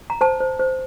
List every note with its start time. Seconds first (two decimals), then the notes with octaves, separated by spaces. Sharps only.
0.10 A#5
0.21 C5 A5
0.40 C5
0.59 C5